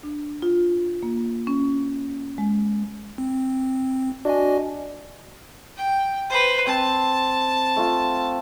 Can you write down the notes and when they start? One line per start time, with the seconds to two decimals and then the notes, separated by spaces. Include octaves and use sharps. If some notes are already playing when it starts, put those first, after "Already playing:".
0.03 D4
0.42 F4
1.03 A#3
1.47 C#4
2.38 G#3
3.18 C4
4.25 D4 F#4 D#5 G#5
5.77 G5
6.30 B4 C5
6.67 C4 A5
7.76 A3 F4